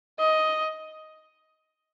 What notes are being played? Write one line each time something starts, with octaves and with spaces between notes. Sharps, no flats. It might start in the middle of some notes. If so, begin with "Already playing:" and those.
D#5